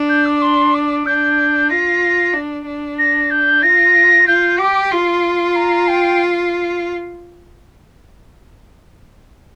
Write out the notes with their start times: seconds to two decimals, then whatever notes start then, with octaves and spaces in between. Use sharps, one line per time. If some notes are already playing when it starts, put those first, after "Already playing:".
Already playing: D4
0.09 G6
0.25 D6
0.41 C6
0.74 D6
1.06 D4 G6
1.70 F4 A#6
2.33 D4
2.66 D4
2.98 A#6
3.30 G6
3.62 F4 A#6
4.27 F4 G6
4.58 G4 D6
4.91 F4 C6
5.55 A#5
5.87 G5